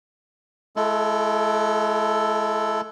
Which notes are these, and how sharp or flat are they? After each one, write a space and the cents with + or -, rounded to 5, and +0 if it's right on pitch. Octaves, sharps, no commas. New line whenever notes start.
G#3 +40 E4 +35 A4 +0